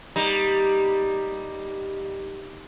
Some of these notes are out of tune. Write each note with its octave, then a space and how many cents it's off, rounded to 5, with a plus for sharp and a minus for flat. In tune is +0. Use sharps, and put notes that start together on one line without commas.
G3 +0 A#3 +0 D#4 +0